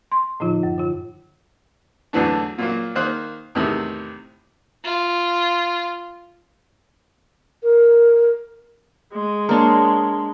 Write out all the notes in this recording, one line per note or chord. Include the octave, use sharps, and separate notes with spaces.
C6
A2 D3 F3 D#4 F4
F#2
D3 F4
E2 A2 D3 E3 F#3 D4
A#2 F#3 A#3
D#3 A#3 C5 F#6
E2 A2 C3 D#3
F4
A#4
G#3
A#3 D4 C#5